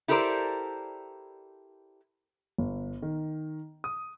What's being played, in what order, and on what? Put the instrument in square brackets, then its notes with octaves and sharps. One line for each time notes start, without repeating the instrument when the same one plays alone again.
[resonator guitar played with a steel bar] E4 G4 A4 A#4 C5 D5
[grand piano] G1
D#3
D#6